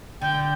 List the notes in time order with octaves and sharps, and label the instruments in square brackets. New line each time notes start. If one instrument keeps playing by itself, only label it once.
[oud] D3 [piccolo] G5